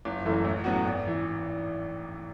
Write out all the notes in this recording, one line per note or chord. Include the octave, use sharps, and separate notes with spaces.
F#1
F#2 E3 A3
A1
A2 F#3 B3 F#4
G#1
E3